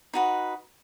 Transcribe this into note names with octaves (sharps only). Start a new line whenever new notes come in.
D#4 F#4 B4